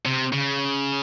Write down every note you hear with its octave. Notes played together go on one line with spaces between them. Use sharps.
C3
C#3